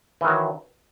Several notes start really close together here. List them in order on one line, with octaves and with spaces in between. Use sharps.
E3 D#3 F#3